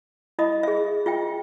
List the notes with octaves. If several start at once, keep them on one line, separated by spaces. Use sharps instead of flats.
E4 D#5 E5 B5 D#6
G#4 E5
F4 E5 G5